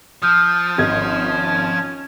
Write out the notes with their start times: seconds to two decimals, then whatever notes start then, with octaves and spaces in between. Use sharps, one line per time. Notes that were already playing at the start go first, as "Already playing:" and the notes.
0.22 F3 D#6 F6 G6
0.78 G#1 C#4 G#6